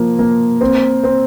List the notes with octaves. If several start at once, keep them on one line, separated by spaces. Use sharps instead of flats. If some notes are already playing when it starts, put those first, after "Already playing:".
Already playing: F3 A#3
A#3
C4
C4